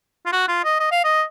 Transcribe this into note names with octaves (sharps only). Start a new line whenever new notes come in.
F4
F#4
F4
D#5
D#5
F5
D#5